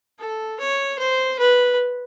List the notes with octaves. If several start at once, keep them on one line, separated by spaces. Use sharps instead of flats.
A4
C#5
C5
B4